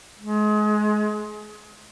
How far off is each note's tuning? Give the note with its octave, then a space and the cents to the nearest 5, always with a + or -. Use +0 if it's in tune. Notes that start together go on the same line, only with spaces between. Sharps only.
G#3 +30